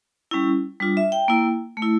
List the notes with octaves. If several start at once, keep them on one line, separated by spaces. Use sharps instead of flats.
G3 C#4 E4
G3 D4 F4
E5
G5
A#3 E4
A3
E4